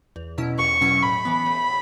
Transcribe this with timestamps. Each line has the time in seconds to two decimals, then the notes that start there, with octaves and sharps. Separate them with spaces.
0.16 E2
0.38 B2 F#3 C#4 E4
0.59 E2 C#6
0.81 B2 F#3 C#4 E4
1.03 A2 B5
1.25 E3 B3
1.46 A2